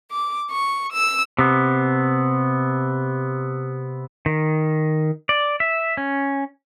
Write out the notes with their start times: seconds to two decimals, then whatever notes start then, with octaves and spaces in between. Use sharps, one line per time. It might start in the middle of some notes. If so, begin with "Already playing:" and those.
0.12 D6
0.49 C#6
0.92 E6
1.39 C3 B3
4.26 D#3
5.29 D5
5.60 E5
5.97 C#4